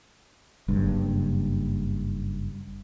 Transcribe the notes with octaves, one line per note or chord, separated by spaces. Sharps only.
F#1 G2